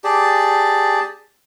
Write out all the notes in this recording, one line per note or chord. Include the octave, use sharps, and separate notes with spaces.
G4 G#4 D5 A5